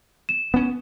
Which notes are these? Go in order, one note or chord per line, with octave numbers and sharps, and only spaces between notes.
E7
B3 C#4